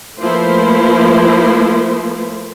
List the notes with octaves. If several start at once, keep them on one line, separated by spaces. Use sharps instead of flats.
F3 A3 A#3 E4 B4 C5